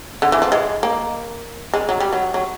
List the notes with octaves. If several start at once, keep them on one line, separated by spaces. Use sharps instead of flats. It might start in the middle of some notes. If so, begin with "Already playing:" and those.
D3
E3
F3
G#3
A#3
G#3
F#3
G3
F#3
F#3